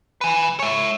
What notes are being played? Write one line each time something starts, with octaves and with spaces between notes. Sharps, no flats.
B4 G#5
C#5 E5